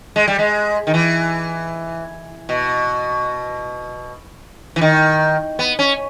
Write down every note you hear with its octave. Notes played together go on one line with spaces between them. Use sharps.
G#3
G3
G#3
D#3
E3
B2
E3
D#3
B3
C#4